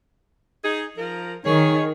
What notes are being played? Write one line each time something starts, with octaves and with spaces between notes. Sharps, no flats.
D#4 G#4
F3 A#4
D#3 G#4 C#5